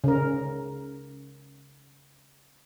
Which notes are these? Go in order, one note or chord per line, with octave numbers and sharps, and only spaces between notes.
C#3 A#4